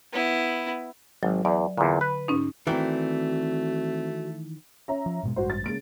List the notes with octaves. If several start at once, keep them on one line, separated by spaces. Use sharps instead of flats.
B3 E4
G#1 F#3
E2 D5
E2 A#2 D3
B4
G#2 C#4 D#4
D#3 E3 A3 C4 F#4 D5
C#4 E5 A#5
F3
G#2 B2 G#3
A1 G2 G#3 F#4 C5
A6
C#3 G#3 A#3 D7